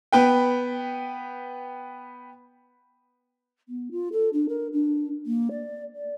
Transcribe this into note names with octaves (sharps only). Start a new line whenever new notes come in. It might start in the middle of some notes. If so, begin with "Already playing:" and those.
B3 B4 G5
B3
F4
A4
D4
A#4
D4
A#3
D5
D5